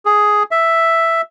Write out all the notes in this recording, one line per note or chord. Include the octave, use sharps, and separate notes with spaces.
G#4
E5